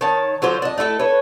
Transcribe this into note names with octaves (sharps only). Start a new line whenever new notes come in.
D#3 C#5 A5
D3 F#3 F4 C5
D4 D#5
A3 E4 F4 A4
A4 B4 C#5